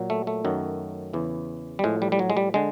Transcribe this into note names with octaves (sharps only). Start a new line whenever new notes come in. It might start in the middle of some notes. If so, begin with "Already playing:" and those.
Already playing: A#2 F#3
A3
A3
F#2 D#3 F#3
E2 C#3 E3
G3
A2 F3 G#3
G3
G3
F#3
G#3
G3
D3 G#3